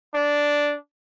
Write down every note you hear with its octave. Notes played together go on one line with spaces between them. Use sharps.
D4